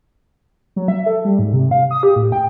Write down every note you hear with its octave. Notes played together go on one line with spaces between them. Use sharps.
F#3
E5
A4
G3
G#2
C3
F5
D#6
G4
A2
G5